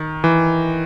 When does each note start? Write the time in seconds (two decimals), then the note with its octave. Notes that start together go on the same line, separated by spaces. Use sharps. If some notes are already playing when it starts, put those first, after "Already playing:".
Already playing: D#3
0.24 E3